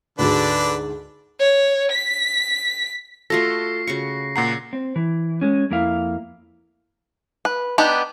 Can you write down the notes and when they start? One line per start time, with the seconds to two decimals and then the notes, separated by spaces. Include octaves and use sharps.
0.19 D2 G#2 D3 G#3 D4 B4
1.40 C#5
1.92 B6
3.30 A3 F4 F#4 A4 A#6 C7
3.87 C#3 F#4 C#6 C#7
4.36 A#2 F#5 A#5 C7
4.73 C4
4.96 E3
5.41 G#3 C#4
5.71 F2 A#3 E4 F5
7.45 B4
7.78 B3 D4 D#4 G4